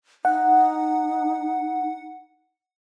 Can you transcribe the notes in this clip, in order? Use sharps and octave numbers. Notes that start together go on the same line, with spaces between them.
D#4 F#5